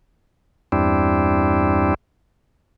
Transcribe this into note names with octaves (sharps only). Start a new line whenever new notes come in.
E2 G2 G3 C4 D4 E4